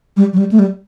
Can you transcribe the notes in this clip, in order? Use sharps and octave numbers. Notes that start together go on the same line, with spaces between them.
G3
F#3
G3
A3
G3